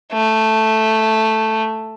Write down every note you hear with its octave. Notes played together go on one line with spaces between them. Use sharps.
A3